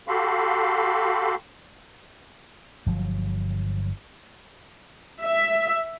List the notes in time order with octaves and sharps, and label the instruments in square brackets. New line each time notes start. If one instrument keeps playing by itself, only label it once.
[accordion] F#4 G4 A4 F5 B5 C6
[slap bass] G1 F3 F#3
[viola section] E5